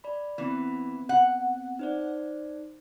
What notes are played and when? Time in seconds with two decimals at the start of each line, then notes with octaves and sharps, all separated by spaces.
0.04 D5 B5
0.38 E3 B3 C4
1.09 F#5
1.79 D#4 C5 D5